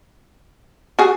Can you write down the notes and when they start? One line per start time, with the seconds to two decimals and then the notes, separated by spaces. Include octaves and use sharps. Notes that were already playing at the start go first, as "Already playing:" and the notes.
0.99 F#4 G#4